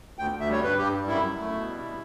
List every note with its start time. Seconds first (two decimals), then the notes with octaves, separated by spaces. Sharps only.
0.18 D2 G5
0.33 D2
0.40 E5
0.48 G3 C#5
0.63 G2 B4
0.77 G2 G4
0.92 G3
1.07 F#2 E4
1.23 F#2
1.38 A3
1.53 B2
1.67 G3
1.83 B2